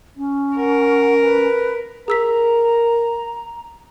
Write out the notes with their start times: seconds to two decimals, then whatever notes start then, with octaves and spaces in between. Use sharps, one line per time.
0.17 C#4
0.56 A#4 F#5
1.23 B4
2.08 G#4 A#4 A#5 E6 B6